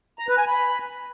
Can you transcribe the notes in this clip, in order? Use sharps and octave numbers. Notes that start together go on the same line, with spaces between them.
A#5
B4
G#5
B5